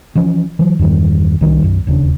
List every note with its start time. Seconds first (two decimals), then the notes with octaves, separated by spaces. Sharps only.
0.15 E3 F3 C#4
0.59 E3 F#3
0.79 E2 G2 D#3 G3
1.41 C2 D#3 E3 G3
1.62 B1 F#2
1.87 E1 D#2 C#3 D4